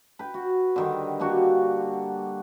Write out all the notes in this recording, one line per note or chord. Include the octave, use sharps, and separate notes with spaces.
B4 G5
F#4
D3 D#3 G3
G3 A#3 D4 F#4